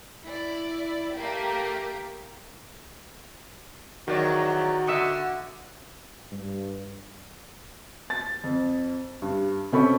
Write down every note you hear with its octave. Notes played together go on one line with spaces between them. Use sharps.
E4 D5
A3 A#3 G4
E2 D#3 F#3 F#4 D5
D3 E5 D#6 C#7
G2
A6
F2
G2
B2 C4 C#4 A4 B5 C#6